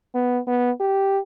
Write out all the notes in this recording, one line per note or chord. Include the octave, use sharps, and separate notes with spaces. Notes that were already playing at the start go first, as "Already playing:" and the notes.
B3
B3
G4